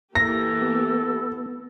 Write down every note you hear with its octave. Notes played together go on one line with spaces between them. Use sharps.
E3 A#3 G4 A4 A#6
B3